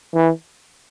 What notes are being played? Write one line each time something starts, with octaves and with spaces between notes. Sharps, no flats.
E3